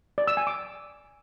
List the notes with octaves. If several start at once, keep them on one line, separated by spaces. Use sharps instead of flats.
D5
E6
G#5
D6